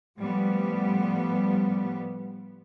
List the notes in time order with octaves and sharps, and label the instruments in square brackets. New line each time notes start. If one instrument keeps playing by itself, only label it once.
[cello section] A2 F3 G3 B3